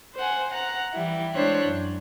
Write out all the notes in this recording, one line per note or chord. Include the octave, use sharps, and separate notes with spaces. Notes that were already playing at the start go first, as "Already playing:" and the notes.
C5 F#5 G#5
F#5 A#5
E3 G3 E4
G#3 D4 E4 C5 C#5 F#6
F#2